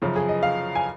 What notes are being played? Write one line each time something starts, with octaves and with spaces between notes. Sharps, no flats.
F#2 C#3 F3
G#4
D#5
F5
G#5